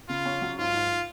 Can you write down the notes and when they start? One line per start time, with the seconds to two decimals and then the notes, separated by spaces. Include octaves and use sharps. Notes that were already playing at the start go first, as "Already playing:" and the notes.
0.09 C#3 F4
0.26 C#4
0.42 F#3
0.58 G#2 F4
0.74 G#2